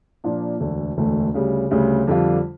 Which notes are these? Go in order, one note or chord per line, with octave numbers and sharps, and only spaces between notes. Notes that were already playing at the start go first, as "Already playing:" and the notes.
A#2 F3 A#3 D4
E1 D2 D3 A3
E1 D2 D3 A3
D2 C#3 G3
D2 C#3 G3
F2 D3 G3 D4 F4